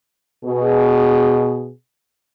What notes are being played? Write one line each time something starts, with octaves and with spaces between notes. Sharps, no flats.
B2 G#4